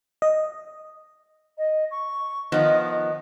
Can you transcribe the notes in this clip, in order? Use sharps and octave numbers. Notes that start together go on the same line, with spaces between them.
D#5
D#5
C#6
D#3 F3 B3 D#5
D#5